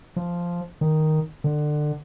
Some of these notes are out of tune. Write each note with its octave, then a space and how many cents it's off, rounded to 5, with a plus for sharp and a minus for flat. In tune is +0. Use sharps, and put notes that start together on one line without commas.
F3 -5
D#3 +0
D3 +25